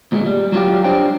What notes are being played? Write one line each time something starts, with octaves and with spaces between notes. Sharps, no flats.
D2 A#2 G#3
G3
F#3 G3 B3 F4 G4
G3 D4 C5 G5